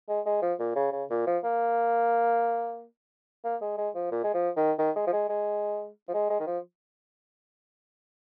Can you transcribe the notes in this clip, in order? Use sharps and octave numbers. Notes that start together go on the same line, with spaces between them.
G#3
G#3
F3
A#2
C#3
C#3
A#2
F3
A#3
A#3
G#3
G#3
F3
A#2
G#3
F3
D#3
D#3
G#3
F3
G#3
G#3
F3
G#3
G#3
D#3
F3